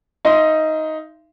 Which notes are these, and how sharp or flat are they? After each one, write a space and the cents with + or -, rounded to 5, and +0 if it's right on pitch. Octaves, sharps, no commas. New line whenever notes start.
D#4 +10 E5 +45 C6 -5